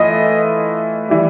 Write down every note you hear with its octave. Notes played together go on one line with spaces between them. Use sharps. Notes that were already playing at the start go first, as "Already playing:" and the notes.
Already playing: E3 A3 F4 D#5
E3 G3